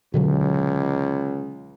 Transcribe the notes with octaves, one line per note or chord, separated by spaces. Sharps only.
C#2 B2 D3 F#3